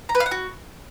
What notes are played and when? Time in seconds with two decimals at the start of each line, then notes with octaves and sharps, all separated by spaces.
0.09 A#5
0.15 B4
0.20 F5
0.26 F#5
0.31 F#4